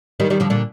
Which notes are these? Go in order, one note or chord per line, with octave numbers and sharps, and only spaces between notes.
D#3 G3
D#3 G3
D3 F3
A#2 D3